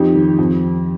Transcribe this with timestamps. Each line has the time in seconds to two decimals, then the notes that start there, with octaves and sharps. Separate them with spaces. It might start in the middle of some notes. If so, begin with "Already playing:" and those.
Already playing: F2 D#4 G4
0.14 D#3
0.39 F2